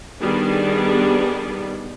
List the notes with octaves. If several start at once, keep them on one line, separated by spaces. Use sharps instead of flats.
D#3 G3 B3 D4 G#4